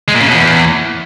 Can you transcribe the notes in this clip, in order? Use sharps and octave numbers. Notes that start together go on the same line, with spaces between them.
G#3
A#2
C#3
B2
E2